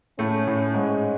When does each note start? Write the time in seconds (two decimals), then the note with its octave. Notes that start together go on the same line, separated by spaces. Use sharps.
0.19 A2 A3 C#4
0.47 A2 A3
0.74 G#2 G#3